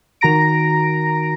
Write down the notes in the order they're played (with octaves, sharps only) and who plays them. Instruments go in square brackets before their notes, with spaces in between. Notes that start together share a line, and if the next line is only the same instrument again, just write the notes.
[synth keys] D#3 F#4 A#5 A#6 D7